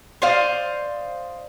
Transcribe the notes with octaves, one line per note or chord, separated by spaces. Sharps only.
C5 D5 D#5 F5